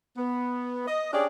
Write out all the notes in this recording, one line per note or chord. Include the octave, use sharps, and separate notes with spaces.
B3
D#5
C#4 D4 G4 G#4 D5